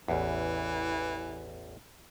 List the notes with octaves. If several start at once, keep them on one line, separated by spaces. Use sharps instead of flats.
A1 E2 E3